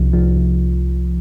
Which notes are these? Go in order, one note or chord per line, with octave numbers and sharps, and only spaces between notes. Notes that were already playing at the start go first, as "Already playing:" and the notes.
Already playing: C2 F3
F3
C2